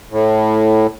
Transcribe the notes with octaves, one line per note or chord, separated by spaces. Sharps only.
A2